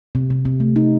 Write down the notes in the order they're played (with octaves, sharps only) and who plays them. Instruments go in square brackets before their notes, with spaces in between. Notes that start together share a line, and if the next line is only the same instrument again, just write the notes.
[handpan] C3
C3
C3
A3
D#4